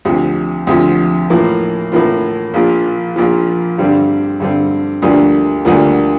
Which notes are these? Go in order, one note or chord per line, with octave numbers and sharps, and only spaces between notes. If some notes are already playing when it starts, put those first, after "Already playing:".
D2 C3 F3
D2 C3 F3
A2 E3 A#3 F4
A2 E3 A#3 F4
A#1 A#2 F3
A#1 A#2 F3
G2 D3 G3 C4
G2 D3 G3 C4
D2 D3 G3 A#3 F4
D2 D3 G3 A#3 F4